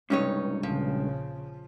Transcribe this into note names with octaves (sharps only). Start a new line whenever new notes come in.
C#2 G2 C3 C#4 D#4 C#5
A#1 C#3 F3